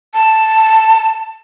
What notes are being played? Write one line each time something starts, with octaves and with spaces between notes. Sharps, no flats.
A5